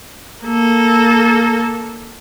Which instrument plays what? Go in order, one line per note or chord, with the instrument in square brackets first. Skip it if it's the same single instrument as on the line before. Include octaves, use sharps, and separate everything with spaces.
[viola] A#3 A4